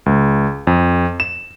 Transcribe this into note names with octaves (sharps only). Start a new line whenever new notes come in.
C#2
F2
E7